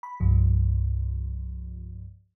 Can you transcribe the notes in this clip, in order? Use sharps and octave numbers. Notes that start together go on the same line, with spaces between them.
B5
C2 G2 F3